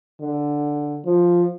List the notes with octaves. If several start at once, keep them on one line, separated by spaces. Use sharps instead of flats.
D3
F3